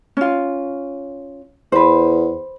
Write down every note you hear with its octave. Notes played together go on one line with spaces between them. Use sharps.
C#4 F4
E2 B4 C5